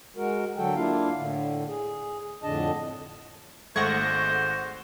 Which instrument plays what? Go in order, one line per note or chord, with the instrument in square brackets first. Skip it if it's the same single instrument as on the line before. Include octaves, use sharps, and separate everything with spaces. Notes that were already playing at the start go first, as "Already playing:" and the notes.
[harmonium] G#3 F#4 A#4
D3 F#3 F#4 A4 G5
A#3 D4 E4 F4 F5
A2 D3
G#4
F2 A2 D3 D4 D#5 A5
[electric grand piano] G#1 G#3 G#6 [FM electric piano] A3 A#6 [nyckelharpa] C5 [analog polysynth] F#5 C#6